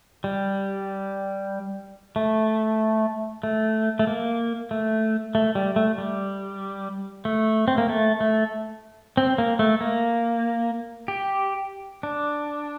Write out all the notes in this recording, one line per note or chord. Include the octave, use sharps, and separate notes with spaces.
G3
A3
A3
A3
A#3
A3
A3
G3
A3
G3
A3
C4
A#3
A3
A3
C4
A#3
A3
A#3
G4
D4